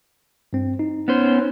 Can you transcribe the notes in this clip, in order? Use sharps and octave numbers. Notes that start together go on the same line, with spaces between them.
G2 C4
D#4
B3 C#4 C5